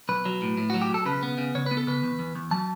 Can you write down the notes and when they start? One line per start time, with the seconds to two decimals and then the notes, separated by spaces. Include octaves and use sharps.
0.09 B1 B4
0.25 F#3
0.42 A2
0.57 A2
0.70 F#3 F#4
0.82 G4
0.90 B1 A4
1.06 C#3 B4
1.23 B3
1.38 C#3
1.55 C#3 C#5
1.66 B3 B4
1.77 A4
1.87 C#3 B4
2.03 E2
2.19 E2
2.35 E2
2.51 F#3 A5